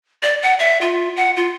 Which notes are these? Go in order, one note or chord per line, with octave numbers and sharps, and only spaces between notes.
D5
F#5
E5
F4
F#5
F4